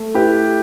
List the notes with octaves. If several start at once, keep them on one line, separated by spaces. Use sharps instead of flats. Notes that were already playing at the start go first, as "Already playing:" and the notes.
Already playing: A3
E4 G4 B4